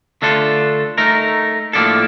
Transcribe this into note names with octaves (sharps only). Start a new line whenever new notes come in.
D3 A3 D4 F4 A4
A3 D#4 A#4
A2 F3 A#3 D4 A4